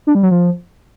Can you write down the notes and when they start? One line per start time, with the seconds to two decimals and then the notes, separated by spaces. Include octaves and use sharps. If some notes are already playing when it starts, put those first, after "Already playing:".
0.07 D4
0.15 G3
0.23 F#3
0.31 F3